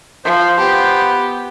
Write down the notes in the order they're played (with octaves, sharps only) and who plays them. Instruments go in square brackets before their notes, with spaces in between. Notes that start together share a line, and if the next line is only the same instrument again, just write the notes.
[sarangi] F3 [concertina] C5
[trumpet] B3 [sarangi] G4